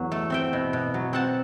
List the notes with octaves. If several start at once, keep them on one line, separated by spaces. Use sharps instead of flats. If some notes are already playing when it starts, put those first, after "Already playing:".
Already playing: E2 F#3
A3
C4 E5 G5
B2
B2
F#3
C4 F#5 A5